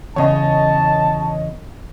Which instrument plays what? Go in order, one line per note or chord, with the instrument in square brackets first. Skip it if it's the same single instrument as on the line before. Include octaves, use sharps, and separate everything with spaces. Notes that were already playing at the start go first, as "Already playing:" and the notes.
[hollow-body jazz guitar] E2 C#3 [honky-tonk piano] C#5 D#5 [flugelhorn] A5